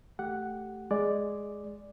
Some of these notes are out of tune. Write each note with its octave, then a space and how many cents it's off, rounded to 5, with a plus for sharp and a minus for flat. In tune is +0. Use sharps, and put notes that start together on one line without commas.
A3 +0 G4 -15 F#5 +0
G#3 +0 D5 +0